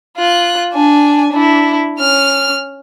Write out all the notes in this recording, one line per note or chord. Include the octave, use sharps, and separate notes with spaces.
F4 F#6
D4 G#5
D4 E4
C#4 F6